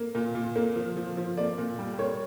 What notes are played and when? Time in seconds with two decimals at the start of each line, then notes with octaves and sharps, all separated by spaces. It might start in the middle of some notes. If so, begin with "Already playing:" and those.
Already playing: A#3
0.15 A#2
0.35 A#2
0.56 A#3
0.76 F3
0.97 F3
1.17 F3
1.37 A#3 D5
1.58 A#2
1.79 G3
1.99 A#3 C#5